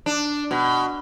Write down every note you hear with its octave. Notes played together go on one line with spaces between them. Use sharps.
D4
B2